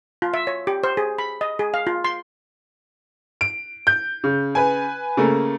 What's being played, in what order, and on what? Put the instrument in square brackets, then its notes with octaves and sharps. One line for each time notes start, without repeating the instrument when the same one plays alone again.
[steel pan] F4
E5
C#5
G4
C5
G#4
B5
D#5
G#4
F5
F4
C6
[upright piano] D7
G6
[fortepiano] C#3
[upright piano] B4 G#5
[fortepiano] C#3 A3 A#3